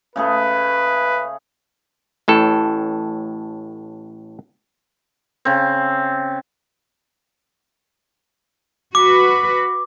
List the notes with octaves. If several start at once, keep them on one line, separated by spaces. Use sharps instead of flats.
C#3 A3 G#4 B4
A1 A2 A4
C#3 C4
F#4 B4 D6